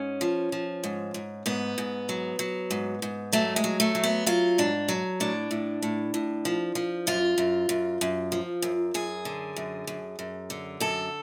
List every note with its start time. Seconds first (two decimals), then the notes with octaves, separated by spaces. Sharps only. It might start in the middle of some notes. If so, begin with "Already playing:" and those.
Already playing: G#2 C#4
0.21 F3
0.52 F3
0.84 G#2
1.14 G#2
1.46 G#2 B3
1.78 G#2
2.09 F#3
2.39 F#3
2.71 G#2
3.02 G#2
3.33 F#3 A3
3.56 G#3
3.64 F#3
3.80 A3
3.95 F#3
4.04 B3
4.26 F#3 F4
4.58 G#2 D4
4.89 F#3
5.20 A2 D4
5.51 A2
5.82 A2
6.14 A2
6.45 F3
6.75 F3
7.07 F#2 F4
7.38 F#2
7.69 F#2
8.01 F#2
8.32 F3
8.62 F#2
8.94 F#2 G#4
9.25 D3
9.56 F#2
9.87 F#2
10.19 F#2
10.50 D3
10.80 F#2 A4